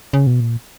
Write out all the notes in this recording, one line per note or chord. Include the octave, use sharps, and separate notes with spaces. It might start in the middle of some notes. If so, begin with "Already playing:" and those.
C#3
B2
A#2